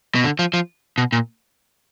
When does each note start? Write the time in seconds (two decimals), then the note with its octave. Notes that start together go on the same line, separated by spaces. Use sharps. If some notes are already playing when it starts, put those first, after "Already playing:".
0.15 B2
0.24 D3
0.39 F3
0.54 F3
0.98 B2
1.12 A#2